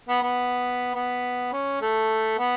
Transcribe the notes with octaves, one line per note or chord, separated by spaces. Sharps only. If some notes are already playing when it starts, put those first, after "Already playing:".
B3
B3
B3
C#4
A3
B3